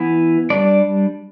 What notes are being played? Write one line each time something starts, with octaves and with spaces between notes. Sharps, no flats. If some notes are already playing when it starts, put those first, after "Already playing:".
Already playing: E3 B3 E4
G3 D4 D5